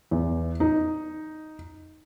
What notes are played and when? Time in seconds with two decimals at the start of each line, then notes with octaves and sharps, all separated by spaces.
0.11 E2
0.60 D#4